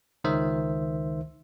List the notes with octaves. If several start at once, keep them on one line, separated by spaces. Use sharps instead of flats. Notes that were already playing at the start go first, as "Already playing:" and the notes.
C#2 D#3 C5 E5